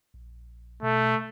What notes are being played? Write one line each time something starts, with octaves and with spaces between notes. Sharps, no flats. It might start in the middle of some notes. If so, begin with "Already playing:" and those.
A#1
B2 A3